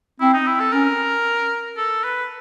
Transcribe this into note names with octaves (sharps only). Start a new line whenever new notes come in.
C4 E4
D#4
E4
A4
C#4 A#4
A4
B4